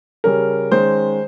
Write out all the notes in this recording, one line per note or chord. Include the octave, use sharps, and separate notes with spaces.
C#3 G3 C#4 A#4
D#3 G#3 C#4 C5